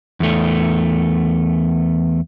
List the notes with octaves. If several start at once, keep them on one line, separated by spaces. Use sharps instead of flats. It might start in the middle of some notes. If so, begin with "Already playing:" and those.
E2 A3